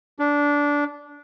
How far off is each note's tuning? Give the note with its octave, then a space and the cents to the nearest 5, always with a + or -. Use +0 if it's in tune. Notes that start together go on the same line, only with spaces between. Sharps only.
D4 -15